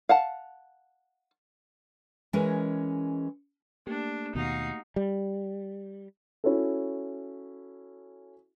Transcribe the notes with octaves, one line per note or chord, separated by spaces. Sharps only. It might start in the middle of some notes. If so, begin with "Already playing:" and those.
F5 F#5 A5
E3 G#3 C#4 G#4 A#4 D#5
A3 A#3 D4 G4
D#2 B2 D#4 F#4 F5
G3
C#4 E4 F#4 A4